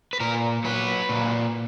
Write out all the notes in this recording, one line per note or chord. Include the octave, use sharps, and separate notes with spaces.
B4
A#2 A#4
F#3 B4
A#2